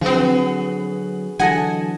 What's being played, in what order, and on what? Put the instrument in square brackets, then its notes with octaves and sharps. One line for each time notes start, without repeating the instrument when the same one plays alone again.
[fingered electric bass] D3 F#3 [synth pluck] F3 C4 [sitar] B3 F#4 G#4
[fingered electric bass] D3 E3 F#3 [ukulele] A4 D#5 F#5 [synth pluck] G#5